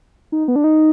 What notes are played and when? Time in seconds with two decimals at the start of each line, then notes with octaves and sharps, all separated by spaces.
0.32 D#4
0.48 B3
0.56 D4
0.64 D#4